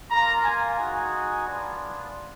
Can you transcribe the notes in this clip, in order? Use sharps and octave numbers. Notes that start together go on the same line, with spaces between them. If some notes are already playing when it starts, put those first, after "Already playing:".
A#3 F4 A#5
G#5
G#3 D#4 F#4 G#5
B3 D4 F4